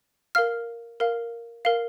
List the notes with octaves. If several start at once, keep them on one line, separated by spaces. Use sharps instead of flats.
A#4 F5 F6
A#4 F5
A#4 F5